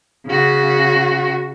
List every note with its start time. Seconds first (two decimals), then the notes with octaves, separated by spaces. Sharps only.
0.27 C#3 F#4